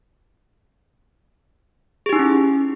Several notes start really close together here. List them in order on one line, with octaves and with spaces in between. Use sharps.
G#4 G4 D#4 E4 C#4